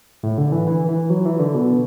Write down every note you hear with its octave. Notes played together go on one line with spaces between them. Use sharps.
A2
D3
E3
E3
E3
F#3
E3
D3
B2